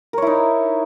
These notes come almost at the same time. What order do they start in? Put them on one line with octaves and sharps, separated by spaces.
A#4 C#5 E4 D#4